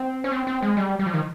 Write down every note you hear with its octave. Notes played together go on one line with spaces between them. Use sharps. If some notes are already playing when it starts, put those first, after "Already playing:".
Already playing: C4
C#4
C4
C4
G#3
G3
G3
F3
D#3